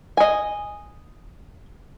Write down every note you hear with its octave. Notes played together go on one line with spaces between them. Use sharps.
D#5 G#5